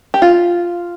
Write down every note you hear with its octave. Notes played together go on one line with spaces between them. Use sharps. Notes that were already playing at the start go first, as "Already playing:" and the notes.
G4
F4